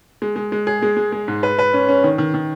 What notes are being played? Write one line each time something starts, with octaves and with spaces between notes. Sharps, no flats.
G#3
G#3
G#3
G#4
G#3
G#3
G#3
G#2
B4
B4
C#4
C#4
D#3
D#3
D#3